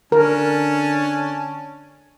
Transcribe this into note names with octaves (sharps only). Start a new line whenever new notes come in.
D3 C#4 D4 A#4 A5